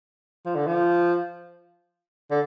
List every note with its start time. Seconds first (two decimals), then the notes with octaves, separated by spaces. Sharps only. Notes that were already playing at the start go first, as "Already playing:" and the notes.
0.46 F3
0.56 D3
0.67 F3
2.31 D3